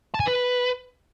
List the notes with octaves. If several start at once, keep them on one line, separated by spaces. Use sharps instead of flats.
A5
G#5
B4